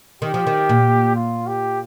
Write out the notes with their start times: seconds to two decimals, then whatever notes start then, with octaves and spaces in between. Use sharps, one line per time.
0.22 D#3 G4
0.34 F3
0.47 D#3
0.69 A#2
1.15 F4
1.47 G4